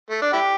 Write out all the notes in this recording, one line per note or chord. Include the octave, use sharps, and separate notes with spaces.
A3
D4
E4 G4